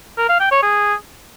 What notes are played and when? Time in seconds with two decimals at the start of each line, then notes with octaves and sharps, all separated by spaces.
0.18 A#4
0.29 F5
0.40 G5
0.51 C#5
0.63 G#4